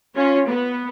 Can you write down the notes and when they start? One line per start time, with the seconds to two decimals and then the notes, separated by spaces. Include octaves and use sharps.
0.15 C#4 F4 C#5
0.48 B3